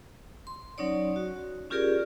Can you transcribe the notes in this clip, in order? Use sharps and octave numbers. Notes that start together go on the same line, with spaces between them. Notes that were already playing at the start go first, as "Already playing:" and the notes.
C6
F#3 C#4 D#4 C#5 D5
F#4
C#4 F4 G4 G#4 A#4 D5